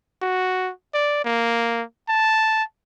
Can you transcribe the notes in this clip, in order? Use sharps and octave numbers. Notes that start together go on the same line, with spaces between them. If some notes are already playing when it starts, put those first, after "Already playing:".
F#4
D5
A#3
A5